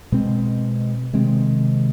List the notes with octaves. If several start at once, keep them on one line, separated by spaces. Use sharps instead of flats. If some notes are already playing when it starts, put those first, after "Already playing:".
B2 G#3 C4
C3 D#3 G#3 C4